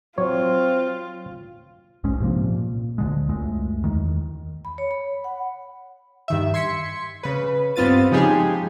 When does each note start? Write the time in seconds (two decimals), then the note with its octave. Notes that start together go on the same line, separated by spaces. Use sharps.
0.18 F#3 C4 F4 C#5
2.04 B1 G#2 G#3 C#4
2.20 G#2 C3 F3 A#3
2.44 A#2
2.98 D2 D3 G#3
3.29 C#2 F#2 G#3 A3
3.84 E2 D#3
4.65 B5
4.78 C#5
4.91 B5
5.24 F#5
6.28 G2 D#3 E5
6.54 C6 G#6 B6 C#7
7.23 C#3 B4
7.76 G2 B3 C4 F4 A6 D#7
8.11 C#3 F3 G#3 D#4 G4 G#4